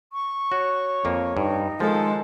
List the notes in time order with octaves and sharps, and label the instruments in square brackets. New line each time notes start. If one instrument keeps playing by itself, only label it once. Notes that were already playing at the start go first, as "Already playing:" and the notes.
[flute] C#6
[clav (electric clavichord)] F#4 [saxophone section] C#5
[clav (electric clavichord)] F2 A#3
[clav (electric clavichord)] G2 [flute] D#4
[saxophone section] D#3 A4 [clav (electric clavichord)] F3 [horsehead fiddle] G#3